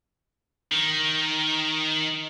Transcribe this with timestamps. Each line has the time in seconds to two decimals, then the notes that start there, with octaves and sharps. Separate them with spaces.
0.71 D#3